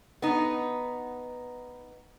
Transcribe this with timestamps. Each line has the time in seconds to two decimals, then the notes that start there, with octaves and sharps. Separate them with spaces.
0.22 B3 D#4